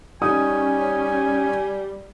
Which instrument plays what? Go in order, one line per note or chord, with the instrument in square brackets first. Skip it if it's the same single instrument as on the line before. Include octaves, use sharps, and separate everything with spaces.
[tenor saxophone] G3 [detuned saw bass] C#4 [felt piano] D#4 D#6 [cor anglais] G#5